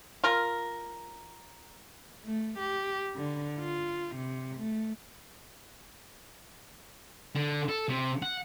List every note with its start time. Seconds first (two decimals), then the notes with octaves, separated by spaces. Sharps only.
0.24 F4 A#4
2.25 A3
2.59 G4
3.16 D3
3.59 F4
4.16 C3
4.58 A3
7.35 D3
7.69 A4
7.88 C3
8.22 F#5